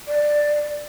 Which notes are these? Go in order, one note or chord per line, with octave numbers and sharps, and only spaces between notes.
D5